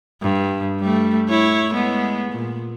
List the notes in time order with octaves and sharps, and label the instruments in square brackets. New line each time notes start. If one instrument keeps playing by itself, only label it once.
[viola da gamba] G2
G3 A3
E4 C#5
G#3 B3
A#2